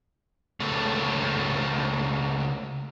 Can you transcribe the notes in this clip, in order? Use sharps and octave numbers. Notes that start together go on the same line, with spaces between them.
C#2 A3